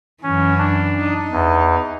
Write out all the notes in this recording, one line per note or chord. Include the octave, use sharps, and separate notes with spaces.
F#2 E3 C#4
D4
D#4
E2